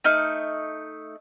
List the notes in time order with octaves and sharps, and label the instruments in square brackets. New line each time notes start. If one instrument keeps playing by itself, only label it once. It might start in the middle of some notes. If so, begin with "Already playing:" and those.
[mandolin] A3 D#4 F6